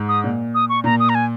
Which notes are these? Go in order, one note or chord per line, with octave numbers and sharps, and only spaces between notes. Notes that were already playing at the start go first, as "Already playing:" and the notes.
Already playing: G#2
D#6
A#2
D#6
C#6
A#2 A#5
D#6
A#5
G#5